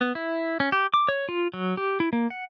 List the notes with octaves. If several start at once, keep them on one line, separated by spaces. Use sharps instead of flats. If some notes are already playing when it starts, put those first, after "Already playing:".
B3
E4
C#4
G4
D6
C#5
F4
F#3
G4
E4
A#3
F#5